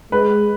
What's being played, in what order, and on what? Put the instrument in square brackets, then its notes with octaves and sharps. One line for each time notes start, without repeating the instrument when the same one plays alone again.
[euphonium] G#3 [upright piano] B4